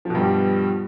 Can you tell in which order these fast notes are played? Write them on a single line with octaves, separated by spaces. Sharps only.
F3 B2 G2 G3